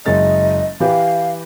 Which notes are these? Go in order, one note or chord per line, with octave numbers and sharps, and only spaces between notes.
F#1 G#3 D#5 A6
E3 G4 B4 F5